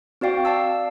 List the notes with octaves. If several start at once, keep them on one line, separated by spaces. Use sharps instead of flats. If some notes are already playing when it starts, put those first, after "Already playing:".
C4 F#4 D5 F5 G5
D5 F5 A5 E6